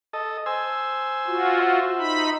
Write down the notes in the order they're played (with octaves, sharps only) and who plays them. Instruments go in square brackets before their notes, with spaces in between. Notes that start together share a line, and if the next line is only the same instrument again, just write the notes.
[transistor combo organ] A4 D#5
C5 G#5 E6
[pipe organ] F4 F#4
[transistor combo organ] C5 E5
[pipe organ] D#4 B5